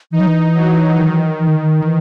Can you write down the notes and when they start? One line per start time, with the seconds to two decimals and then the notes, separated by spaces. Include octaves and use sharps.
0.12 E3 D#4
0.20 F#3
0.27 E3
0.55 F#3
0.97 D#3
1.40 E3
1.48 D#3
1.62 D#3
1.84 E3